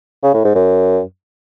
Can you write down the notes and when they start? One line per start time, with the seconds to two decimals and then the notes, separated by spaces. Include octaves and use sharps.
0.23 C#3
0.34 A2
0.45 G#2
0.55 F#2